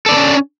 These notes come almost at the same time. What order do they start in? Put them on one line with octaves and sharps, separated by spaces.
A4 D5 B3 D4 C#4